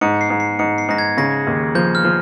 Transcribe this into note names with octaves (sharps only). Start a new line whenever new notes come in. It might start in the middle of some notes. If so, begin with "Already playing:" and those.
G#2 C#7
C7
G#2
C7
G#2 C#7
C7
G#2 A#6
G#6
C#3 A#6
D#2
F3 G6
F6
F3